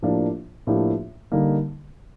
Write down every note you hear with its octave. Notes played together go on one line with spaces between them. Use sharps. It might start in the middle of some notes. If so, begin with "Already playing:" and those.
A2 F3 A#3 D4 G4
A2 F3 A#3 D4 G4
D3 G3 A#3 D#4